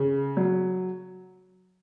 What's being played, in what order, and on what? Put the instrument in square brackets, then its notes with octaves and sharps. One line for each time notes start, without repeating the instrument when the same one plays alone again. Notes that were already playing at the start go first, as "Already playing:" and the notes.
Already playing: [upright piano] C#3
F#3